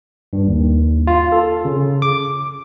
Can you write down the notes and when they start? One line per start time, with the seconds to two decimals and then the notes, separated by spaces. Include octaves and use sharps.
0.33 G2
0.47 D#2
1.07 F4
1.32 A4
1.65 C#3
2.02 D6